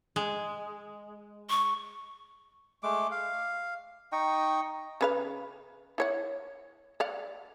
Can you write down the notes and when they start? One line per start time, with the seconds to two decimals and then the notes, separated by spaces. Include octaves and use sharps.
0.16 G#3
1.50 C#6
2.83 G#3 A3 D6
3.11 F5
4.12 D#4 D#5 G5 C#6
5.01 C#3 B4 F5
5.98 E4 C#5 F#5
7.00 D5 F5 F#5